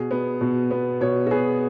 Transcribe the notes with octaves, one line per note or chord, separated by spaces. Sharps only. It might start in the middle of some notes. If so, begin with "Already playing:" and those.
Already playing: B2 G#4
B3
B2
B3
B2 C#5
F#4
B3 G#4